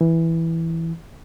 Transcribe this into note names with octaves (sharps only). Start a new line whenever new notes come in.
E3